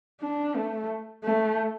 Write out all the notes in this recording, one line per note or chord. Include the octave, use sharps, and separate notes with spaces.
D4
A3
A3